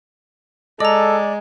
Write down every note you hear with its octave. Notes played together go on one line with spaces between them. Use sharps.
G#3 A4 D5 D#5 A#5